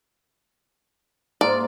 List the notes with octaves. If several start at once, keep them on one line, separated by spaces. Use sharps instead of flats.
G#2 A#3 F4 D5